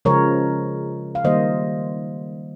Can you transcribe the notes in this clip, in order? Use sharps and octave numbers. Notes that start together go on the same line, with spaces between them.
C#3 F3 G#3 A#4 C#5
F5
D#3 G3 A#3 C5 D#5